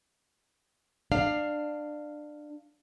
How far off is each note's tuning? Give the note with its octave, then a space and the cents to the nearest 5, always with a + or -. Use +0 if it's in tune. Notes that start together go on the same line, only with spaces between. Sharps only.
D4 +20 F5 +0